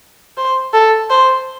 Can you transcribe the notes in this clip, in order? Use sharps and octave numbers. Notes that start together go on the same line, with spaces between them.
C5
A4
C5